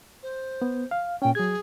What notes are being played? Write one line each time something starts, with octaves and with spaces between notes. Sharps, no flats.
C5
B3
F5
A#2 C#4 G5
F#3 G#4 G#6